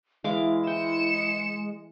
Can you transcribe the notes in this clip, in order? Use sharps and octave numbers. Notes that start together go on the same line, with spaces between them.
E3 G#3 E4 F5 D6
G5 C#7 E7